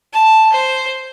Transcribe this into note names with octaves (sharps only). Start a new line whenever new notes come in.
A5
C5